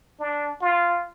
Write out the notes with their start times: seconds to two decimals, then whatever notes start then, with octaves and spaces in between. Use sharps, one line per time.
0.20 D4
0.61 F4